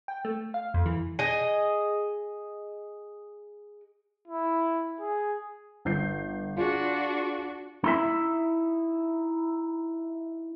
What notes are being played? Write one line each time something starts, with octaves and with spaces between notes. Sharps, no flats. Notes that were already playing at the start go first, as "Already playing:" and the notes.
G5
A3
F5
F2
E3
G#4 D#5
E4
G#4
G1 G6 C7
D4 F4 F#4 G#4
D#4 E4 E5